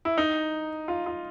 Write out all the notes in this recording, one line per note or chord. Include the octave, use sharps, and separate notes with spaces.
E4
D#4
F4
F4